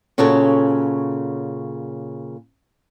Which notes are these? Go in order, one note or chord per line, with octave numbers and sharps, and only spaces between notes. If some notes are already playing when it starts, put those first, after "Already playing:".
A#2 C#3 C#4 F#4 A4 C#5